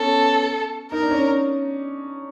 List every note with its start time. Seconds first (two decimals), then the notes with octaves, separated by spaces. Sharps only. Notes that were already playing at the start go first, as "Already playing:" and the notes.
Already playing: B3 C#4 A4
0.92 D#4 A#4
1.02 D4
1.11 C#4